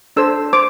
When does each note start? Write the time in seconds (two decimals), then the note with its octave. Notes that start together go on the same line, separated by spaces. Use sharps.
0.16 D4 A4 C5 E6
0.53 C5 D6